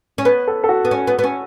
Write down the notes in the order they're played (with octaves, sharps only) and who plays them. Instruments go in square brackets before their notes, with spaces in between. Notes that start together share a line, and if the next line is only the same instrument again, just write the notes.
[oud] C#4
[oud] B3 [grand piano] B4
[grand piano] A4
A4
F#4
[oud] B3
C#4
B3
B3
C#4